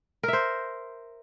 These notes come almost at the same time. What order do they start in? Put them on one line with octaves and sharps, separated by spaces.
A#4 E5 C5